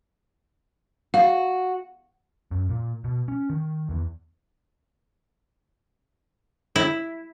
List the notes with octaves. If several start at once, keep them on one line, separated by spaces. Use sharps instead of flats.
F#4 F5
F#2
A#2
B2
C#4
D#3
E2
E4